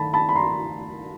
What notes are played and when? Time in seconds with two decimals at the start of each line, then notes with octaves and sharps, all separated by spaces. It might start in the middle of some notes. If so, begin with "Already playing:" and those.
Already playing: D#3 A3 A5 B5
0.13 A5 B5
0.29 B5
0.35 A#5 C6